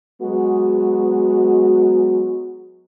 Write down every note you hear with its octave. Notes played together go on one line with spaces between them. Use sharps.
F#3 G#3 B3 F#4